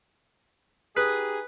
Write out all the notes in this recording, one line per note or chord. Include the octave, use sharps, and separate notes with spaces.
D#4 G4 G#4 B4